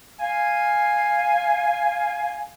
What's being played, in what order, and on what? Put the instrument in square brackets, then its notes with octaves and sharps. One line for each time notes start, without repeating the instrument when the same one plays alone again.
[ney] F5 [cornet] G#5